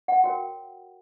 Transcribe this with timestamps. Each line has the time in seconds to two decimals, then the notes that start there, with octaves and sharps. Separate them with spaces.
0.08 F#5
0.24 F#4 A#4 C#5 G5